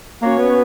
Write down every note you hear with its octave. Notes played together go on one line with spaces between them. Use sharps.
A#3 C#4 F#4 C#5
B3